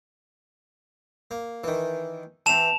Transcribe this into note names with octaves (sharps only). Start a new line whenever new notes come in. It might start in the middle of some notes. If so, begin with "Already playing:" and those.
A#3
D#3 E3
E3 C4 A5 E7 F7